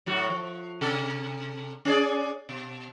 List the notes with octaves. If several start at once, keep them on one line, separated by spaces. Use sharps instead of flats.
A2 F#3 F#4
F3
C3 A4
C#4 G#4 D5
B2